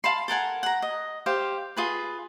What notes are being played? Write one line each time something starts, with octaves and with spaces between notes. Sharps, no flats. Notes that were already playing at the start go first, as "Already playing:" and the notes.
F5 A5 B5 C6
A4 A#4 F#5 G#5
F#5 A#5
D#5
G4 C5 F5
F4 G#4 B4